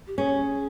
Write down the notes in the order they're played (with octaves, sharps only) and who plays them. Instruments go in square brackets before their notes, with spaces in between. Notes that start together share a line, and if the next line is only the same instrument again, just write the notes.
[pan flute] G4
[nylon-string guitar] C#4 [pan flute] G#4